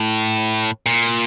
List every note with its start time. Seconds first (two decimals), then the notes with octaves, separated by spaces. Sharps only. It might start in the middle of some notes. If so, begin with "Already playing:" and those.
Already playing: A2
0.86 A#2